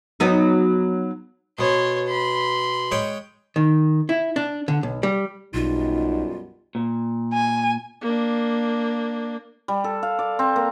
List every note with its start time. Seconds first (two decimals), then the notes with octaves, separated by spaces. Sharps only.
0.20 F#3 B3 D#4
1.59 B2 B3 C#5 C6
2.07 B5 C6
2.91 G#3 C#5 G5
3.56 D#3
4.09 E4
4.36 D4
4.68 D3
4.83 B1
5.03 G3
5.54 B1 F#2 B2 G3 D#4 F4
6.75 A#2
7.33 G#5
8.01 A#3 D4
9.68 G3
9.84 A4
10.03 F5
10.19 D5
10.39 C4
10.56 A#3